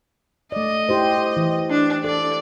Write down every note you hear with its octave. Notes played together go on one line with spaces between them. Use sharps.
A3 D5 D#5
E4 G4 C5
E3
D4
A4 D5